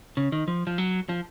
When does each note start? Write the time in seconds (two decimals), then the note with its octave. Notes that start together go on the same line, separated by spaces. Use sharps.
0.17 C#3
0.32 D#3
0.48 F3
0.67 F3
0.78 F#3
1.09 F3